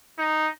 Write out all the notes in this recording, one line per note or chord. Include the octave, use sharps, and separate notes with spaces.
D#4